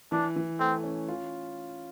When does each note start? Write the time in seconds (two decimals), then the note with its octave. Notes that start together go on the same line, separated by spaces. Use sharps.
0.12 E3 D4
0.36 E3
0.59 A3 C4
0.84 C#4
1.08 F4